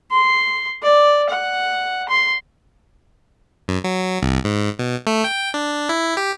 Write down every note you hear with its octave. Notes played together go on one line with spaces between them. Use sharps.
C6
D5
F#5
C6
F#2
F#3
C2
G#2
B2
A3
G5
D4
E4
G4